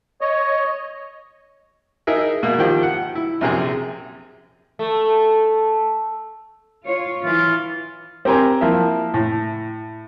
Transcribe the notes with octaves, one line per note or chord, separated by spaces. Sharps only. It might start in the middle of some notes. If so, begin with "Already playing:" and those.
C#5 D#5
D#4 G#4 A#4 E5
B2 A#3
D#3 F3 G4
F#5
E4
A#1 F#2 C3 G4 G#4
A3
F4 C#5
E3 E4 F4
C4 G4 A#4 G5 G#5 A#5
F3 A#3 E4 E5
A2